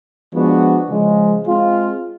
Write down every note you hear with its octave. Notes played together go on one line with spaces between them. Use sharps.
F3 G#3 B3 D4 F#4
C#3 F3 G#3
G#3 C4 F4